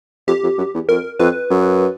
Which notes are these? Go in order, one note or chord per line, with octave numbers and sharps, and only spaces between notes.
F2 G4
F2
F#2
E2
F2 A#4
F2 B4
F#2